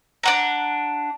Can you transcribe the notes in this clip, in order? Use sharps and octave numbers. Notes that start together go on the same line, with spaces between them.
D4 F#5 A#5